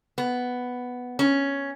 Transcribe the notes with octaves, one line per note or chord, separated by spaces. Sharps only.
B3
C#4